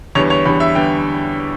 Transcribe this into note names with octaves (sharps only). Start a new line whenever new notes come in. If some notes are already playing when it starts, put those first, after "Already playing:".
E2 D3 G3 B3 C#5
C#5
E2 D3 G3 B3 B5
E5
D3 G3 B3 G5